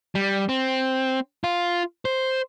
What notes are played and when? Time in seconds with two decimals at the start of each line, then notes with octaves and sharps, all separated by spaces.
0.15 G3
0.49 C4
1.44 F4
2.05 C5